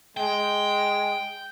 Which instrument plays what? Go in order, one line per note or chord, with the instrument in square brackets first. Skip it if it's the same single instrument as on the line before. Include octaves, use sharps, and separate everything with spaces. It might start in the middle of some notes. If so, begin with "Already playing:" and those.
[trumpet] G#3 [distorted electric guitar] G5